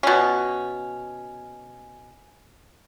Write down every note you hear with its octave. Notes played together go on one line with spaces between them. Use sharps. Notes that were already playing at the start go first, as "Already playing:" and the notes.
B2 C#4